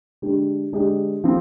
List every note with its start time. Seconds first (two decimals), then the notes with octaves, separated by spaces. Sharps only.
0.22 D3 G#3 D4 G4
0.72 D3 G#3 D4 G4
1.24 F3 C4